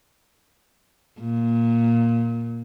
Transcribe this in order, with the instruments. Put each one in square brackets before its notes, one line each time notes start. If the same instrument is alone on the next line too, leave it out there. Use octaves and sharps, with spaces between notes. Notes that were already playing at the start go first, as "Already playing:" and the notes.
[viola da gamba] A#2